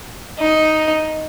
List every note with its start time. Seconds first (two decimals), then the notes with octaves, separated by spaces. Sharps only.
0.39 D#4